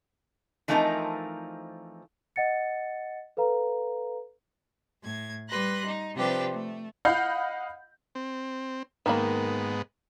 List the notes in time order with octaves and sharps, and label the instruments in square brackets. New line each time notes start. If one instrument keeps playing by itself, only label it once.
[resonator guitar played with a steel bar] E3 F3 A3 C4 D#4 A#4
[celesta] D#5 F#5 A6 C#7
A4 B4 F5 A#5
[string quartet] A2 G#6
G3 B4 C6 F#6 A#6
D#4
C3 F3 C4 D4 G4 B4
A3
[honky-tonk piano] D#5 F5 F#5 B5 G6
[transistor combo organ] C4
[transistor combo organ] G#2 B3 [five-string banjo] D#3 A#3 B5